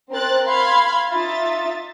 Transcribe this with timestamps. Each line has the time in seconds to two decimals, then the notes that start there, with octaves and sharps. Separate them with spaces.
0.12 C4 A#4 C5 F#6 A6
0.46 F5 B5 C6 G#6
1.10 D#4 F4 E5 A6